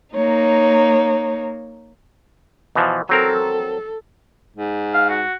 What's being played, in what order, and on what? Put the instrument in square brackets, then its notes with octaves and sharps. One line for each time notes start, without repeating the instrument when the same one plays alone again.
[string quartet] A#3 D#4 C#5
[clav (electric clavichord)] B2 E3 F3
[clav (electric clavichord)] F#3 C4 A#4 [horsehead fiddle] A4
[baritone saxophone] G#2
[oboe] F5
F#4